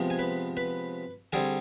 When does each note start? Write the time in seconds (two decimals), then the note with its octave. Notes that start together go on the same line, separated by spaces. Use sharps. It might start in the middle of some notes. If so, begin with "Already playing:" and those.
Already playing: C3 F3 G#3 B3
0.10 G#5
0.19 B4 B5
0.57 B4 B5
1.33 D3 G3 C4 G#4 G#5